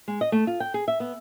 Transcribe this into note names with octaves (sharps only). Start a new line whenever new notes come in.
G#3
D#5
A3
F4
G5
G#4
E5
B3